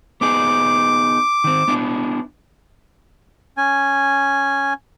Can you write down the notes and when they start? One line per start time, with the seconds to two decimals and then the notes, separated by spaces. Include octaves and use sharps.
0.21 B3 D#4 G#4 D6
1.44 D#3 C4
1.68 B3 D4 E4
3.57 C#4 G#5